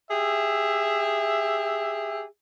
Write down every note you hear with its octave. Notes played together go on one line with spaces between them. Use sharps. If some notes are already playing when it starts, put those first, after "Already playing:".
G4 G#4 E5